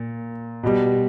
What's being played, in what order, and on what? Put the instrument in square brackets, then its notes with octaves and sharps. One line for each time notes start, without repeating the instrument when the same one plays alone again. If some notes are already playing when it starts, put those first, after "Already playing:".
Already playing: [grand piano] A#2
B2 G3